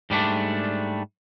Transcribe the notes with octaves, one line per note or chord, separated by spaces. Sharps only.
G#2 G3 A3 D4